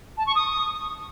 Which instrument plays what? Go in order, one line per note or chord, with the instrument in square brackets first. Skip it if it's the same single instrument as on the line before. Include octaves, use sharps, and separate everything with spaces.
[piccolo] A5
C#6
D#6